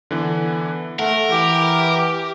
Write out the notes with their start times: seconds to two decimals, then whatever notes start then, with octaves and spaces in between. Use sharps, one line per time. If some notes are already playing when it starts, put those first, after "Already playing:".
0.11 D3 E3 B3
0.99 A3 A#4 F#5
1.30 E3 G4